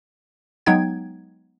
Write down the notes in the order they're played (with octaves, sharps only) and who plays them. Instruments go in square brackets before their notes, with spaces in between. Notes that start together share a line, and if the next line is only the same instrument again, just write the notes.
[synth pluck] F#3 G#3 B3 D#4 G5 G#6